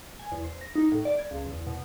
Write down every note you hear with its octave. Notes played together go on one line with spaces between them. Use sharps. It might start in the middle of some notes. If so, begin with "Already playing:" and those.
G#5
E2
C5
A#6
D#4
A2
D5
G#6
C#2
E2
B2